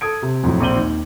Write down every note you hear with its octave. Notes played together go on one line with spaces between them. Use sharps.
A4 D#6 G#6 D7
C3
F2 A2 F#3
A#1 C4 D6 D#7 F#7 G7
D#2